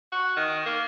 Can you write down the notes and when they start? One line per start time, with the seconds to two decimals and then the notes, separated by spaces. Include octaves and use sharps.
0.12 F#4
0.36 D#3
0.66 A#3